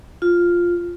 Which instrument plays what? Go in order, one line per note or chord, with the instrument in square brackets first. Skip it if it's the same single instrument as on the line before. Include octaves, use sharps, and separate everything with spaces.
[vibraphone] F4